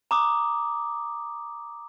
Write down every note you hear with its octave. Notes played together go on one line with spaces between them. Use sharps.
A#5 D6 D#6